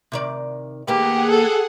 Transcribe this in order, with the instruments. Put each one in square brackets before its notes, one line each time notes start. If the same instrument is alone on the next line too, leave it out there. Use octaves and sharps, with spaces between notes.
[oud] C3 D#3 D5
[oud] D#2 A#3 B3 [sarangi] G4 [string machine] G#4 F#5
[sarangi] A4